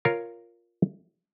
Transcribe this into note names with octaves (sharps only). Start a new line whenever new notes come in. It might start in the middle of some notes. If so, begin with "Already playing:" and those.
F4 A#4 C#5 F5